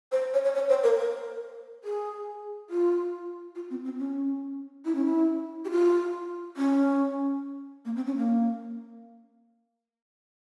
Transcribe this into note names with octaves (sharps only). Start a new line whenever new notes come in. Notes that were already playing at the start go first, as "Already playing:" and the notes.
C5
C#5
C#5
C#5
C5
A#4
A#4
G#4
F4
F4
C4
C4
C#4
E4
C#4
E4
G4
F4
C#4
A#3
C4
C#4
A#3